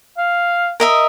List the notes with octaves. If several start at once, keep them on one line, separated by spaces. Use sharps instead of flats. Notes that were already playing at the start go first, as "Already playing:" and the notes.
F5
A#4 D#5 E5